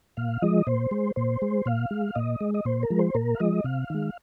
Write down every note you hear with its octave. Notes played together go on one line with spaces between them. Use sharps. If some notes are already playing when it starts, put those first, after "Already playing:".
A#2 F5
F3 G#3 D#5
A#2 C5
G#3
A#2 C5
G#3
A#2 F5
G#3
A#2 D#5
G#3
D#5
A#2 C5
A#4
F3 G#3
C5
A#2 A#4
F5
F3 G#3 D#5
C3 F5
D#3 G#3